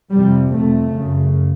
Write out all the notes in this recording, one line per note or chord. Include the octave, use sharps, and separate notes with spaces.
F2 C3 G3
F2 C3 A3
F#2 C#3